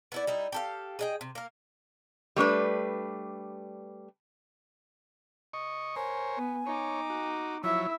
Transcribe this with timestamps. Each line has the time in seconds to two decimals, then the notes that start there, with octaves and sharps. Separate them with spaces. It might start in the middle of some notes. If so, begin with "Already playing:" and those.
0.12 B3 E4 D5
0.27 G3 D#4 E4
0.52 G4 A4 F5
0.99 G#4 D#5 G5
1.21 C3
1.35 A#3 A#4
2.36 G3 A3 D4 B4
5.53 D#5 C#6
5.96 A#4 C5 C#5 G#5
6.37 B3
6.67 D#4 C#5 D6
7.10 F#4
7.64 F3 F#3 E4 C#5 E5 E6